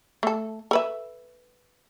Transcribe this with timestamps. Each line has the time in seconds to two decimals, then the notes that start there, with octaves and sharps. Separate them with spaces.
0.23 A3 A4
0.71 A4 B4 E5